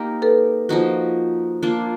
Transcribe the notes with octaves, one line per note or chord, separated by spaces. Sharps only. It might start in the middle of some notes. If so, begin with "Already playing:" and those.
Already playing: A#3 D#4 G4 A#4
A4 B4
F3 A#3 D#4 F#4
A#3 D4 F4